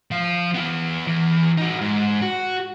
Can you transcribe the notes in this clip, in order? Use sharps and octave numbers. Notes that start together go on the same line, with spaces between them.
F3 F5
B3 E4
E2 E3
D#4 F#4
G#2
F#4